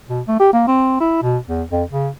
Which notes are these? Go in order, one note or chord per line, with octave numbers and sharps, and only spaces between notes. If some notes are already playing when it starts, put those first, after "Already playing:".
B2
A3
G4
A#3
C4
E4
B2
E2
F2
C#3